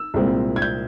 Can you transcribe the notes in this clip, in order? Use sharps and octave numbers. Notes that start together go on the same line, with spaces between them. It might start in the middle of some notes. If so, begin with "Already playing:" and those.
Already playing: E6
C2 A#2 G#3 C4
G#6
G6